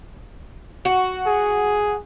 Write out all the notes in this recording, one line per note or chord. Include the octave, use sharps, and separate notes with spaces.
F#4
G#4